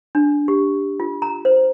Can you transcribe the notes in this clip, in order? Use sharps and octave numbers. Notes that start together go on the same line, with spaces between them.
D4
G4
F4
A#5
C5